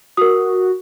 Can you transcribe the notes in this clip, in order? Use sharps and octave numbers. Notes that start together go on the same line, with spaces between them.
F#4 A#4 D#6